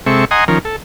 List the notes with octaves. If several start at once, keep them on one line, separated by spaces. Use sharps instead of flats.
C3 G#3 C4 A4 E5 C#6
D#5 F#5 G#5 A#5 C6 D#6
D#3 F3 C#4 A#4
A4